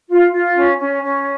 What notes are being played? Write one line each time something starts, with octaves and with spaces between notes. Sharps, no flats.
F4
F4
C#4
C#4
C#4